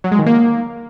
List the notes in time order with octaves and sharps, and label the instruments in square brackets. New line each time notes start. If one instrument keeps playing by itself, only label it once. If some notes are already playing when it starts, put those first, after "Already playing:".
[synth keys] F#3
G#3
D#3
A#3